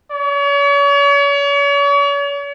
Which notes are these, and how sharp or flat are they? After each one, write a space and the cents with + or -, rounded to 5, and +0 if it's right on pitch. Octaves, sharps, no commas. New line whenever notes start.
C#5 +40